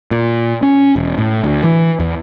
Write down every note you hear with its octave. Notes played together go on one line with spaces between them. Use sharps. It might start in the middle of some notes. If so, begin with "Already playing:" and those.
A#2
C#4
E1
A2
D2
E3
E2